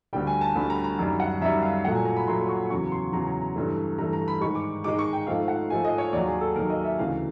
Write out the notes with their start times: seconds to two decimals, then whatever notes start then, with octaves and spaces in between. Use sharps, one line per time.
0.13 D2 D3 G3 G5
0.27 G#5
0.41 A5
0.55 D2 D3 G3 B5
0.70 A#5
0.84 A#5
0.99 F#2 D#3 G3
1.20 F#5
1.41 F#2 D#3 G3 E5
1.62 F5
1.84 A#2 F#3 A3 F#5
1.95 G#5
2.05 A#5
2.16 B5
2.27 A#2 F#3 A3 C6
2.49 C#6
2.69 E2 C#3 F#3 C#6
2.92 C6
3.13 E2 C#3 F#3 A#5
3.27 A#5
3.41 A#5
3.56 G2 E3 A3
3.98 G2 E3 A3 A#5
4.13 A#5
4.28 B5
4.41 G#2 D#3 G#3 C#6
4.55 D6
4.84 G#2 D#3 G#3 D6
4.99 C#6
5.13 G5
5.27 G#2 F3 A3 F5
5.48 F#5
5.69 G#2 F3 A3 G#5
5.85 D#5
5.98 C#5
6.13 D#2 D#3 F#3 D5
6.27 G#4
6.41 A4
6.56 D#2 D#3 F#3 A#4
6.70 D#5
6.85 E5
6.99 D2 C#3 E3 F5